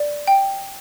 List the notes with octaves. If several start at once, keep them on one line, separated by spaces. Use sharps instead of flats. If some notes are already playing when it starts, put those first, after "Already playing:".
Already playing: D5
G5